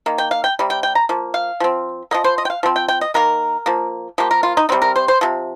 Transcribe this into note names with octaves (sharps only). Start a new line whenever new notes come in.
D#3 A#3
G5
F5
G5
C3 G3
G5
G5
A#5
F3 A#3
F5
F3 C4
F3 A#3 D#5
C5
D#5
G5
F5
F3 C4
G5
G5
D#5
D#3 A#3 A#4
F3 A#3
F3 A#3 G4
A#4
F4
D#4
C3 G3 C4 D#4
A#4
C5
C5
C3 F3